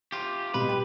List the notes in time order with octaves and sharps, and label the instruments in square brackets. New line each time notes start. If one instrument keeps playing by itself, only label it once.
[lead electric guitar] F4 G4
[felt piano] B2 G3 B3 [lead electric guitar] B4
[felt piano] G4